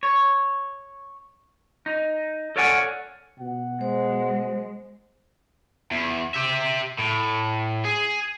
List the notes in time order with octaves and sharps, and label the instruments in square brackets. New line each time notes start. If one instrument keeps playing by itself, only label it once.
[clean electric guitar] C#5
D#4
A4 C#5 D5 F5 F#5 G#5
[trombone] B2 [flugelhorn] F#5
[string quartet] G#3 [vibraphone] C5
[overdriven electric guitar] E2
G4 E5
A2
G#4